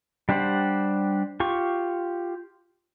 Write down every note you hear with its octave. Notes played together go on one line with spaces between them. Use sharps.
G3 D4 G4 C5 F#5
F4 G4 C#6